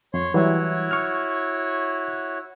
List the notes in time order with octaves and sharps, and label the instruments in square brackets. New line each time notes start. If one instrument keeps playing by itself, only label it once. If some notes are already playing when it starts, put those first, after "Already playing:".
[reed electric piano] F2 [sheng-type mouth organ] C#5 C6
[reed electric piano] E3 F#3 G3 [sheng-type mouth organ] E4 F#4 C#5
[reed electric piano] C#6 F6